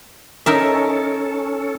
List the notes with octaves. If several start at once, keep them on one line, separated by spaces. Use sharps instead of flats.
C#4 D#4 A4 A#4 E5